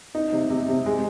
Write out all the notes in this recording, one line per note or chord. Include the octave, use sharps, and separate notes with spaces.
D#4
C3
C3
C3
G#3